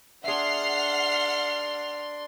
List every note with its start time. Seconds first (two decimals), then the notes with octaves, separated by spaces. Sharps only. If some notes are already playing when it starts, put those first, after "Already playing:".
0.24 D4 G#4 E5 F#5 C6 F6 C7